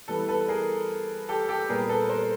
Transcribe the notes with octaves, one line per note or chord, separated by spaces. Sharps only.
E3 G3 B3 A4 B4
A4 B4
G#4 A#4
G4 A4
G4 A4
A#2 G3 B3 G#4 A#4
A4 B4
A#4 C5